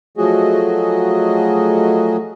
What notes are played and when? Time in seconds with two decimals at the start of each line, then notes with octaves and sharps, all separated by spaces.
0.17 F3 F#3 A3 F#4 G#4 D#5